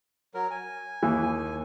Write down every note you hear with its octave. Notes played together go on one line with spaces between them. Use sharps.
F#3 A#4
G#5
D#2 E3